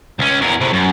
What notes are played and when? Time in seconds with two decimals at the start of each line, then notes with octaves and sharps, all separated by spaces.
0.19 C#2 C#4
0.41 E2 A#4
0.61 A2 C3
0.73 F#2